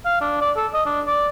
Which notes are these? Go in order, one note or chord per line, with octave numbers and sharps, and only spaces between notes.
F5
D4
D5
A4
D#5
D4
D5